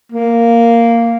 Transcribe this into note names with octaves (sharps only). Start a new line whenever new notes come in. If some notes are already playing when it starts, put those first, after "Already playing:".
A#3